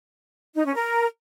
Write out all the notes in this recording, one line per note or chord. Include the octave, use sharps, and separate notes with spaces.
D#4
C#4
A#4